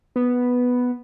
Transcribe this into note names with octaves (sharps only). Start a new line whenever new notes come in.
B3